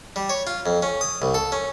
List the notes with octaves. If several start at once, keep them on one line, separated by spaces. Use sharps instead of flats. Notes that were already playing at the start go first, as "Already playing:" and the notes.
G3
C#5
F4
F2
C#4
D#6
C2
A4
C#4